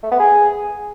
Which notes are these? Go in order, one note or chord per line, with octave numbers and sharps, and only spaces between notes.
A3
B3
G#4